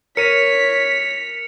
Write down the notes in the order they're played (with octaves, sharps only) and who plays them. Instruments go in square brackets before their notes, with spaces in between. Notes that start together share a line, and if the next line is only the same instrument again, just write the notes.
[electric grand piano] A#4 D#7 [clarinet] C#5 [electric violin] B6 [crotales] C#7 F7